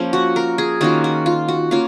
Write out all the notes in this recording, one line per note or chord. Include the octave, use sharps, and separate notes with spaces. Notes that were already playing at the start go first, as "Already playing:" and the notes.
Already playing: F3 A#3 C#4 G#4
F#4
A#4
G#4
D#3 A#3 C#4 F4 F#4
F#4
F4
F#4
A#3 C#4 F4 F5